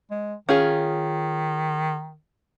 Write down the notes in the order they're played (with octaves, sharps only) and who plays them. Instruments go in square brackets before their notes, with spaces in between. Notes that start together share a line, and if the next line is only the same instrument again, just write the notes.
[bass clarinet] G#3
[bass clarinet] D#3 [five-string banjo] C#4 F4 G#4